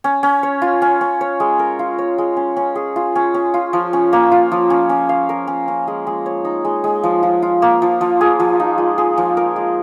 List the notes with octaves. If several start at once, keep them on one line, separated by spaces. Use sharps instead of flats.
C#4
C#4
C#5
F4
C#4
C#4
C#5
G#3
A#4
F4
C#5
G#3
C#4
C#4
G#4
F4
C#4
C#4
F4
F3
C#4
A#3
F4
F3
C#4
C#4
F5
A#4
C#4
C#4
G#3
G#3
C#5
D#4
G#3
G#3
F3
F3
F4
A#3
F3
F3
G#4
F3
D#4
G#3
G#4
F3
A#4
G#3